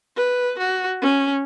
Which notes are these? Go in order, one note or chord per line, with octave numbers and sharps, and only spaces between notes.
B4
F#4
C#4